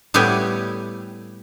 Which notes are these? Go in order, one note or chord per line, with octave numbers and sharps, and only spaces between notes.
A2 G3 A3 B3 G4 G#5